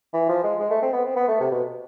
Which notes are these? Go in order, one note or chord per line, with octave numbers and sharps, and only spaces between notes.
E3
F3
G#3
G#3
A3
C4
B3
C4
B3
A3
C3
B2